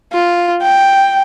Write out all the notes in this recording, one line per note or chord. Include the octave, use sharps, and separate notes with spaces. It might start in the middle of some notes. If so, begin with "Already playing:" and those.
F4
G5